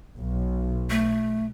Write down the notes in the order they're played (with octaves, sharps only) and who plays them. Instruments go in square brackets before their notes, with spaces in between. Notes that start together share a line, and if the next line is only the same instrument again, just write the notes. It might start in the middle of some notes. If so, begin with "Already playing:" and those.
[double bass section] B1
[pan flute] A3